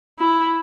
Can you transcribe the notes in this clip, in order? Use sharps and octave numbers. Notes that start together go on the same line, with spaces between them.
E4